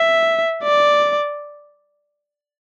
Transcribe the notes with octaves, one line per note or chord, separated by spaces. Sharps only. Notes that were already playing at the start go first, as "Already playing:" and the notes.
Already playing: E5
D5